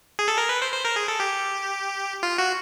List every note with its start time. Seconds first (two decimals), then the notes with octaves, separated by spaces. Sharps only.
0.19 G#4
0.28 A4
0.38 A#4
0.49 B4
0.62 C5
0.72 C5
0.85 A#4
0.96 G#4
1.08 A4
1.20 G4
2.23 F4
2.38 F#4